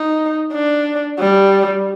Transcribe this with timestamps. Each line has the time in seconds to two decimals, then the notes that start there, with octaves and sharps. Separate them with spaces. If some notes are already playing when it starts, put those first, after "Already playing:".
Already playing: D#4
0.53 D4
1.19 G3